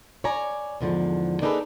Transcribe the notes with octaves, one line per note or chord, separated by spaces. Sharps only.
C#5 D5 G#5 A#5
E2 G#2 D3 F3
A#3 D4 D#4 G#4 A4 B4